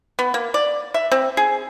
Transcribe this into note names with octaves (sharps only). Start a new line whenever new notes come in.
B3
A#3
D5
E5
C4
G#4